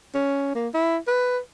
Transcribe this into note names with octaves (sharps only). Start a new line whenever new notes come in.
C#4
A#3
E4
B4